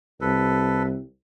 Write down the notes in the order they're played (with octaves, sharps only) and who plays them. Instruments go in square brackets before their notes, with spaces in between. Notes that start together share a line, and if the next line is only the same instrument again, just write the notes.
[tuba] C2 [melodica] A4 B4